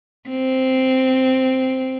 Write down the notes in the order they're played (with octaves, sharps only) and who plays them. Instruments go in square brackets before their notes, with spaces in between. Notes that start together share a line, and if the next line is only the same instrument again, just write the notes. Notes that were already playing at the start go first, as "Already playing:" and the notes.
[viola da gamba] C4